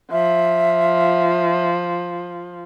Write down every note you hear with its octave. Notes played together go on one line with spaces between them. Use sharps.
F3 E5